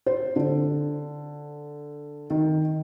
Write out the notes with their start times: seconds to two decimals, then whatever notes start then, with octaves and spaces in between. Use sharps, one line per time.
0.06 C5
0.36 D3
2.30 D#3